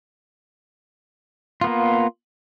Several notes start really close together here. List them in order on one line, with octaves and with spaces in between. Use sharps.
F4 B3 A#3